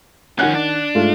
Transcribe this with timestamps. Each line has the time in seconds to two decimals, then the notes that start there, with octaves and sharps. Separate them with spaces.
0.39 D#3 F3 C#4 F#5 F#6
0.55 D4
0.95 G#2 A3 F4